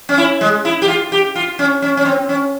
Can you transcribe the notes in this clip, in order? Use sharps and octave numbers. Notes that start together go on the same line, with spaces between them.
C#4
E4
G#3
E4
G4
F4
G4
F4
C#4
C#4
C#4
C4
C#4